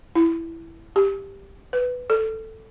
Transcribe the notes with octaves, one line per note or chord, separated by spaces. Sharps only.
E4
G4
B4
A4